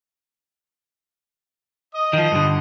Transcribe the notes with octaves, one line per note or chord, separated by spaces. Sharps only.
D#5 D#6
D#3 F3
G2 D3